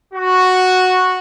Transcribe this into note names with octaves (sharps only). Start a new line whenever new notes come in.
F#4